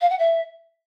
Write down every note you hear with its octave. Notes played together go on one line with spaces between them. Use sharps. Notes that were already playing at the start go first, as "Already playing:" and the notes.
F5
F#5
E5